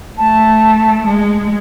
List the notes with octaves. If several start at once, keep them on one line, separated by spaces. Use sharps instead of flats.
A3 A5
G#3